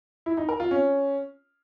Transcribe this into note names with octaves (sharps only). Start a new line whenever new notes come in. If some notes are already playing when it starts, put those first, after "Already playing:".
E4
D#4
A#4
F4
C#4